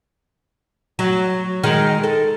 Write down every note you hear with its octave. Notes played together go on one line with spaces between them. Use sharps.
F#3
D#3 G#3
A4